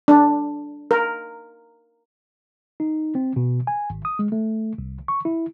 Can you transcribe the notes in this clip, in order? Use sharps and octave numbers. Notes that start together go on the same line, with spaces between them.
D4
A#4
D#4
C4
B2
G#5
G#1
D#6
G#3
A3
C2
C#6
E4